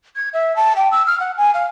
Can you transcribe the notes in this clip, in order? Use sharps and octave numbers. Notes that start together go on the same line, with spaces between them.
G#6
E5
A5
G5
E6
F6
F#5
G#5
F5